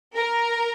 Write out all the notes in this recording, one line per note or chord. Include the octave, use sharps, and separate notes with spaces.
A#4